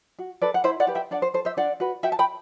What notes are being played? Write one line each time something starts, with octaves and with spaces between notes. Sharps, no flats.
F#4
A4 B4 D5
F#5
E4 C5 E5
D5 F#5
G4 B4
E5 G5
D4 D5 F#5
C5
A4 C5
C5 E5
D4 D5 F#5
F#4 B4
F#4 E5 G5
A5
G5 B5